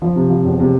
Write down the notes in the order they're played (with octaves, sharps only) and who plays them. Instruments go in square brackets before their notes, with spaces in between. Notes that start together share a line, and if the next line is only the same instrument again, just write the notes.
[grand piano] F3
C3
F3
E1
C3